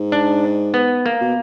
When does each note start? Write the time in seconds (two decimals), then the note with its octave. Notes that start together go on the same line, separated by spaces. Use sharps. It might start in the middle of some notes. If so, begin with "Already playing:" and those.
Already playing: G#2
0.12 D4
0.74 B3
1.06 A#3
1.21 B2